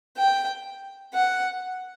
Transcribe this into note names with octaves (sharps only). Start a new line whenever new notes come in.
G5
F#5